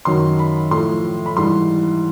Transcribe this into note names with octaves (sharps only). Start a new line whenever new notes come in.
F#2 D#3 F#3 C6
B5
A2 F3 C6
B5
G#2 E3 G3 C6